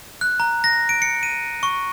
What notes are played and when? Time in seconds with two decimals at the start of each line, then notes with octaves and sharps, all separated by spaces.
0.21 F#6
0.40 A#5
0.64 A#6
0.89 D7
1.02 C#7
1.23 D#7
1.63 C#6